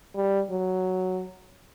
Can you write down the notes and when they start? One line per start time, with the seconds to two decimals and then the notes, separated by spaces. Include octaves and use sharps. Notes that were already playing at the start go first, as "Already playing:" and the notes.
0.16 G3
0.50 F#3